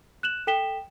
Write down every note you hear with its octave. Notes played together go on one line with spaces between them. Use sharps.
F#6 E7 F#7
A4 G5 B6 E7 G7